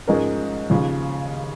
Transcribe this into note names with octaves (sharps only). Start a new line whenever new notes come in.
G#2 F3 G#3 C#4 A#4
D#2 C#3 F3